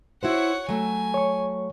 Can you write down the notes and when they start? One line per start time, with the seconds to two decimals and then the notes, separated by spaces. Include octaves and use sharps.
0.23 E4 F#4 C5 C#5 F#5
0.69 F#3 A3 G#5
1.14 C#5 C#6